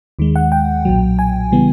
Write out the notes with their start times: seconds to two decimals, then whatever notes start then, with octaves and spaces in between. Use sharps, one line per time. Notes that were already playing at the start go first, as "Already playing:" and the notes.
0.19 D#2 D#3 G#3
0.36 F#5
0.52 G5
0.85 B1 A#2 F#3
1.19 G#5
1.52 C#3 E3 G3 B3